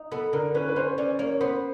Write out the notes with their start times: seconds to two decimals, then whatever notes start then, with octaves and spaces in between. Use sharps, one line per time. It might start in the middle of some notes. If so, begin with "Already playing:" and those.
Already playing: D#4
0.12 B3 A4
0.33 D3 A#4
0.55 C#4 B4
0.69 B4
0.76 C#4 C5
0.98 C#4 D5
1.19 A#3 C#5
1.40 B3 C5